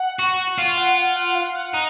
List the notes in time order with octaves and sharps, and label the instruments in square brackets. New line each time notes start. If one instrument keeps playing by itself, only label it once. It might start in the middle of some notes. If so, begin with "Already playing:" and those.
Already playing: [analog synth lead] F#5
[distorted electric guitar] F#4
[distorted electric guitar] F4 [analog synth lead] F5
[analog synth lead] F#5
F#5
F5
F#5
[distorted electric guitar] D#4